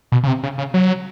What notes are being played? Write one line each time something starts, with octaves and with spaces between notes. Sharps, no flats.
B2
C#3
C3
C#3
C#3
F#3